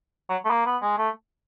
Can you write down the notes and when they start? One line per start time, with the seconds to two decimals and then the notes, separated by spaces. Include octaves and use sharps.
0.29 F#3
0.45 A3
0.50 A#3
0.66 B3
0.82 G#3
0.98 A3